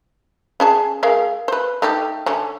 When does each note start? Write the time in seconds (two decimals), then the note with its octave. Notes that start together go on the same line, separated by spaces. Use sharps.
0.60 C#4 G#4 A5
1.03 G#3 A#4 F5
1.48 B4 C5
1.82 A3 D#4 G4
2.26 D3 C#4